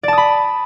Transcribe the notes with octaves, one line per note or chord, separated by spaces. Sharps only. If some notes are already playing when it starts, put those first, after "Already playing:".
D5 A5 B5 D#6